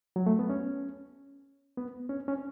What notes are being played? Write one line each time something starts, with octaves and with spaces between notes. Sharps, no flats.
F#3
A3
B3
C#4
B3
C#4
C#4